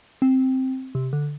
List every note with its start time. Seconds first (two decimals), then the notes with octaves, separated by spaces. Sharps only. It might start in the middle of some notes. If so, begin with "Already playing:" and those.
0.22 C4
0.95 C3
1.13 D3